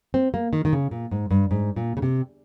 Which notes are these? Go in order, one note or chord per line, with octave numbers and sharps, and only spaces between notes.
C4
A#3
D#3
D#3
C#3
A#2
G#2
G2
G#2
A#2
C#3
C3